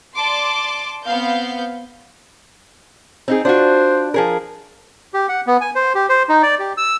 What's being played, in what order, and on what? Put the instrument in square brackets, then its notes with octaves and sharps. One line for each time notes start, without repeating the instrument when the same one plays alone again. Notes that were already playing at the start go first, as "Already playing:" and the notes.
[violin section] D5 A5 C6 D6
B3 C4 F5 G6
[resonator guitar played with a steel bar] C4 D#4 G#4
[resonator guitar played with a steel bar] D4 F4 F#4 [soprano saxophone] C5
[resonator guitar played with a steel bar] F3 G#4 A#4
[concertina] G4
F#5
B3
G#5
C5
G4
C5
D#4
D5
G4
E6